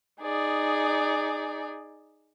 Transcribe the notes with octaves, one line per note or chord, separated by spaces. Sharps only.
D#4 G#4 D5